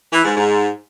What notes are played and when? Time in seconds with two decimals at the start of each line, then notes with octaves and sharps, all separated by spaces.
0.13 E3
0.25 G#2
0.37 G#2